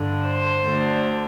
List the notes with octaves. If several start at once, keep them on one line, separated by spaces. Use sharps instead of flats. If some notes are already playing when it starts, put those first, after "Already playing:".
Already playing: G2 D3
C5
D2 D3